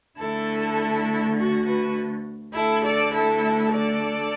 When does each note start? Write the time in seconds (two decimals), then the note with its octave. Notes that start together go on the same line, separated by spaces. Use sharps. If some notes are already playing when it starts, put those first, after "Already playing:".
0.19 D2 D3 A3 E4 A4
1.37 F#4
1.66 F#4 B4
2.55 D2 D3 A3 E4 A4
2.84 A4 D5
3.13 E4 A4
3.72 A4 D5